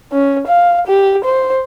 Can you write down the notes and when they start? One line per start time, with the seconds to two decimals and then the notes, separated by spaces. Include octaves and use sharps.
0.12 C#4
0.47 F5
0.87 G4
1.24 C5